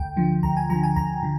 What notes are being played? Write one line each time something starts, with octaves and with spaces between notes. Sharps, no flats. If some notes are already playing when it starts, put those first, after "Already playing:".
Already playing: D2 G5
D3 F3
D2 A#5
G#5
D3 F3 A#5
G#5
D2 A#5
D3